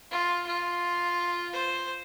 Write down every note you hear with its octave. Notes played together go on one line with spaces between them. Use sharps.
F4
F4
C5